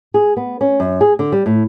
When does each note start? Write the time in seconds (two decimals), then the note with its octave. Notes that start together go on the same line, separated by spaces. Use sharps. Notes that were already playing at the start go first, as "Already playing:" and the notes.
0.14 G#4
0.37 B3
0.61 C#4
0.80 F#2
1.01 G#4
1.19 D3
1.32 G3
1.46 A2